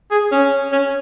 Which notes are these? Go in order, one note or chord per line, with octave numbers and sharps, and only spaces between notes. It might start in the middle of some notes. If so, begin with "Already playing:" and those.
G#4
C#4
C#4